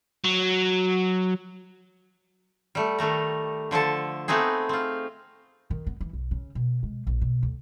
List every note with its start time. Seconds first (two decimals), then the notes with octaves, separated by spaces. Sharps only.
0.24 F#3
2.75 G3 A3
2.98 D#3 G3 A3 A#5
3.71 D3 F3 A4 A5
4.28 A3 B3 C4 D#4 G#4
4.69 C4 F4
5.70 D#3
5.87 B3
6.01 E3
6.13 B1
6.31 C#3
6.55 B2
6.83 G#3
7.07 A#1
7.22 B2
7.43 D2